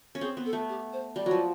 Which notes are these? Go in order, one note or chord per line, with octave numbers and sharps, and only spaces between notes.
C#4
C4 G#4
B3
A4
A3
G4
C5
G3 D5
F3 F#3